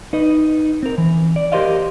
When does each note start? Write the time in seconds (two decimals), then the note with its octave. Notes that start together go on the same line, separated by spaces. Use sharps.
0.13 D#4 B4 D#5
0.83 C4 A#4
0.98 E3
1.36 D5
1.52 G4 A#4 C5 D#5 F5